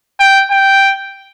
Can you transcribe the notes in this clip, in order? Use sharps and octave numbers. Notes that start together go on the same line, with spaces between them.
G5
G5